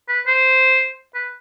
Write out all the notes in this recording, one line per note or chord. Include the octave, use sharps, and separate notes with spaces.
B4
C5
B4